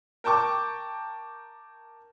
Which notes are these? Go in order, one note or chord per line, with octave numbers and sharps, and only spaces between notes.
A#4 G5 A5 C#6 D6